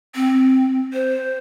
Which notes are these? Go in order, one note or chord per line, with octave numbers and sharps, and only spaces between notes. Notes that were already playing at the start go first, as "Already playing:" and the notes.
C4
C5